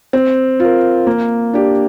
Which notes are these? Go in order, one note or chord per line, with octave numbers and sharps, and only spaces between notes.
C4
F4 A#4
A#3
D4 G4